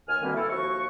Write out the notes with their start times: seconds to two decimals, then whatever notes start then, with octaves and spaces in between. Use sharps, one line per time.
0.08 D#2 G#5 F6
0.21 B2 D3 D#3 G3 A#3 C4
0.34 E4 A4
0.49 D#2 F3 F#4 C#6